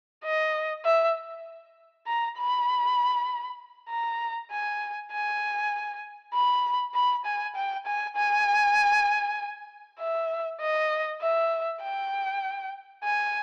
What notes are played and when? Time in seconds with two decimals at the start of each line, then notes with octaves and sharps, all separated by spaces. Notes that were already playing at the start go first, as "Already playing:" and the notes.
0.25 D#5
0.85 E5
2.07 A#5
2.38 B5
3.90 A#5
4.51 G#5
5.12 G#5
6.34 B5
6.95 B5
7.25 G#5
7.56 G5
7.86 G#5
8.16 G#5
10.00 E5
10.61 D#5
11.21 E5
11.82 G5
13.04 G#5